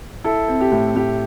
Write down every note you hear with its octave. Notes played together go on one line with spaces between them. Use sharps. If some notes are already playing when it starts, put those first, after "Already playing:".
E4 A4
C4
G4
A2
A2 G4